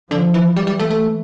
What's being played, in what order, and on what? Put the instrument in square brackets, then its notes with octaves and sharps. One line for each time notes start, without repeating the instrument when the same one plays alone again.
[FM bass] D3 [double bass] F3
[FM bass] E3
[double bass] E3 [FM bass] G3
[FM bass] G3
A3
A3